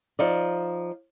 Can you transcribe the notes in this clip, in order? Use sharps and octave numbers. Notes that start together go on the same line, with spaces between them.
F3 D#4 D5